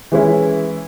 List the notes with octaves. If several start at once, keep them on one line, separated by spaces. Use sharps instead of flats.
E3 G#3 C#4 E4